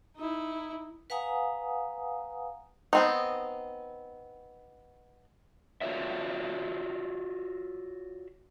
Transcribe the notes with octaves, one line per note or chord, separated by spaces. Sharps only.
D#4 E4
B4 F5 F#5 G#5 A#5 D#6
B3 C4 D#4
F4 F#4 C#5 D5 E5